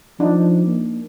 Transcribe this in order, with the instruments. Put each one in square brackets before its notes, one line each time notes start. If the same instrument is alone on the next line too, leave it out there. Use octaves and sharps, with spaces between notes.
[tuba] F3 [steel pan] D4 D#4
[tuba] A#3